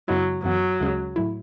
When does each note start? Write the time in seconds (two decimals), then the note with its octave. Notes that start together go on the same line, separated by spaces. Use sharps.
0.08 F#2 C#3 F#3 G#3 B3 E4
0.44 F#2 E3 F#3 B3
0.80 D2 C#3 G#3 C#4 G#4
1.16 A2 F#3 A3 E4